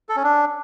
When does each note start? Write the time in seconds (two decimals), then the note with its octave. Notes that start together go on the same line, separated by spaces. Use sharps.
0.09 A4
0.16 C#4
0.24 D4